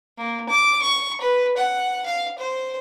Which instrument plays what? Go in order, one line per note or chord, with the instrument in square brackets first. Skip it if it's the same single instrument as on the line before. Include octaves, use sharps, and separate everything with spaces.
[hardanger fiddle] A#3
D6
C#6
B4
F#5
F5
C5